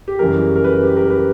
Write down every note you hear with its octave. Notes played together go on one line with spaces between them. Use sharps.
G4
F#2 C#3 E3 G3 A#4
A#4
B4
G4
A#4
B4